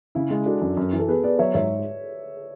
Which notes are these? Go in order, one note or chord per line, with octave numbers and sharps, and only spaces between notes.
C#3 E4
G#3
D4 F#4 A4
F#2
F#2
E3
A4
B3 G#4 B4
B3 B4 D5
F#3 C#5 E5
G#2 C#5 E5